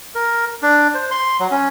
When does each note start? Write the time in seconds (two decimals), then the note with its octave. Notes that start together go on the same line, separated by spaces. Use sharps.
0.15 A#4
0.62 D4
0.94 C5
1.11 C6
1.40 F#3
1.51 C#4